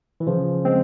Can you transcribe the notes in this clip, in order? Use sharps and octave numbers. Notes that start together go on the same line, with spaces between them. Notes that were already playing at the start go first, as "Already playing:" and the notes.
E3
C#3 F3
G#3 C4